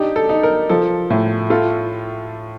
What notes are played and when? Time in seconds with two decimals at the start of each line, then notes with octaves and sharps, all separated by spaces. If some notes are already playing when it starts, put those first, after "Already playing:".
Already playing: D4 D#4 G4
0.16 A4
0.29 D#4
0.43 A#4
0.69 F3 A4
1.10 A2
1.50 F4 A4